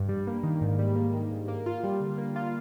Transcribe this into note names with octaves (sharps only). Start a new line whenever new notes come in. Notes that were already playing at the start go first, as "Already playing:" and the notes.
Already playing: G2
G3
A#3
D#3
G#2
G3
A#3
D#3
G#2
A#3
F4
G3
D3
A#3
F4